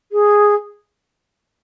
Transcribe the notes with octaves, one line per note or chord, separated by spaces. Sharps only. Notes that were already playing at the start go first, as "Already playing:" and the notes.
G#4